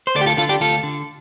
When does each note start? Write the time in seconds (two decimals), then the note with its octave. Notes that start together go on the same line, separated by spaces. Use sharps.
0.07 C5
0.15 D2 A4 D5
0.21 G4
0.26 F4 A4
0.37 D3 F4 A4
0.49 D4 G4
0.60 D2 F4 A4
0.83 D3